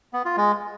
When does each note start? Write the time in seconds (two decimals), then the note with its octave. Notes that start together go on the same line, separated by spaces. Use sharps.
0.13 B3
0.25 F4
0.37 G#3